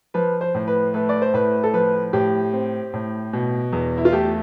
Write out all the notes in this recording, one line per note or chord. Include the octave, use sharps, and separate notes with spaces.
F3 B4
C5
A2
B4
A3 B4
D5
C5
A2 B4
A4
F3 B4
A2 G4
C4
A2
B2
E2
E4
F4
A3 G4